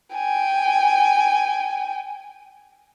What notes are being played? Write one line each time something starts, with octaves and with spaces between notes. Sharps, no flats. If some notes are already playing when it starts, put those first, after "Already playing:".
G5 G#5